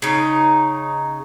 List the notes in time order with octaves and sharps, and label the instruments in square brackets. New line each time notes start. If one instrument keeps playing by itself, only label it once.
[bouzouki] C#3 D#4